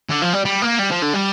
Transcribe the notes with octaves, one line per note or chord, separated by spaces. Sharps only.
D3
F3
G3
G3
A#3
G3
F3
D3
G3